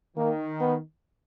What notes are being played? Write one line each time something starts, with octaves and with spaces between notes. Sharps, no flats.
D#3 A#3
B3